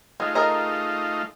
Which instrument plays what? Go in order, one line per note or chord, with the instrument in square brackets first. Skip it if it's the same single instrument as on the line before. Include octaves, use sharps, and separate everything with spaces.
[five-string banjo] G#3 [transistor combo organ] A3 D#4 F4
[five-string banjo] G#4 A#4 D#5